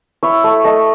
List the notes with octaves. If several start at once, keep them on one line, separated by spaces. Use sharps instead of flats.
E4 C#5
A3
A3 D#5